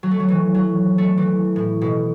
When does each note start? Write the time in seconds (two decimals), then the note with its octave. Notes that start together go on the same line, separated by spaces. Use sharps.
0.03 F#3
0.11 A3
0.20 F#3
0.28 E3
0.54 F#3
0.98 A3
1.18 E3
1.56 A2
1.81 B2